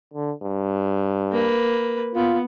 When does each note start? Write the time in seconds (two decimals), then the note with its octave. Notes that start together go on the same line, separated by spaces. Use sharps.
0.14 D3
0.44 G2
1.32 A#3 B4
2.15 B3 F4